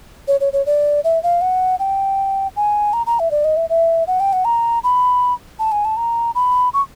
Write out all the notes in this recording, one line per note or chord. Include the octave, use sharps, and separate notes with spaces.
C#5
C#5
C#5
D5
E5
F5
F#5
G5
G#5
A#5
A#5
E5
D5
D#5
E5
E5
F#5
G5
F#5
A#5
B5
A5
G#5
A5
A#5
B5
C#6